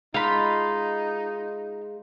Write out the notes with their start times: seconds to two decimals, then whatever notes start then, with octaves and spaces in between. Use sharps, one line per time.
0.14 G#3 D#4 F4 B5